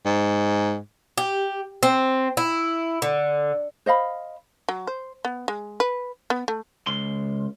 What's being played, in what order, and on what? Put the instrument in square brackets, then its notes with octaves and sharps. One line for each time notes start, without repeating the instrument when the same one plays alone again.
[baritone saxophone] G#2
[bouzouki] G4
C4
E4
D3
[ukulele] C5 D#5 F5 B5
[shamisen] F#3
C5
B3
G#3
B4
B3
A3
[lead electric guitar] C#2 C6